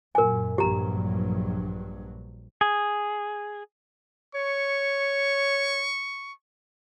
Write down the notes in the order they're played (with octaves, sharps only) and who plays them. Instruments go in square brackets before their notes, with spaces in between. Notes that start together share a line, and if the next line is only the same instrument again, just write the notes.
[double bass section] F#2 A#2 [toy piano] A#4 G#5
[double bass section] A#1 G2 F#3 [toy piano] G4 A#5
[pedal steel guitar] G#4
[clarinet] C#5 [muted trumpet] C#6